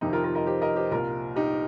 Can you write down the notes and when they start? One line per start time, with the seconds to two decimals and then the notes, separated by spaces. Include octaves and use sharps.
0.01 F2 C3 D#3 D#4 G4
0.13 F4 A#4
0.24 F4 A#4
0.35 A#4 D#5
0.47 G4 C5
0.61 A#4 D#5
0.76 G4 C5
0.91 C2 A#2 F4 A#4
1.36 D#4 G4